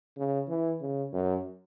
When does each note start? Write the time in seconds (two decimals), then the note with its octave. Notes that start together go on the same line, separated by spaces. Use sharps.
0.17 C#3
0.48 E3
0.81 C#3
1.13 F#2